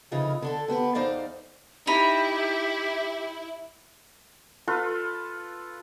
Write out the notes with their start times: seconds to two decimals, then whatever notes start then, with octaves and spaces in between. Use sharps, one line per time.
0.11 F2 C#3 E3 D#4 F4 G#4
0.42 D3 D4 A4
0.68 D3 B3 G4 B4
0.95 E2 E3 D#4 C5 D5 F5
1.87 D#4 E4 G4 A#5 B5
4.68 F4 A4 B4